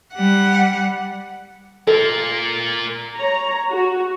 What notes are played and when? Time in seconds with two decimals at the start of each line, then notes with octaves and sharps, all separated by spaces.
0.14 G3 F#5
1.87 A#3 F4 A4
3.15 C#5 A#5
3.69 F#4